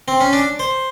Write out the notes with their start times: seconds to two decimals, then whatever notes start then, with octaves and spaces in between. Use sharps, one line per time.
0.08 C4
0.21 C#4
0.33 D4
0.59 C5